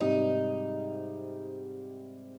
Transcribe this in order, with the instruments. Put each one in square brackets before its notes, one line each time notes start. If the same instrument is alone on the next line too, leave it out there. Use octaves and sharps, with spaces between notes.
[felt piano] G#2 C3 G3 [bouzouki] D#4